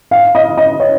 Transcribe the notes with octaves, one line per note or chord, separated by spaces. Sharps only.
F5
D#5
D#5
C#5